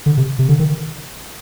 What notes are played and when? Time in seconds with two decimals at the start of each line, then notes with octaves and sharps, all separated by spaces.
0.06 D3
0.17 C3
0.39 C3
0.49 D3
0.59 D#3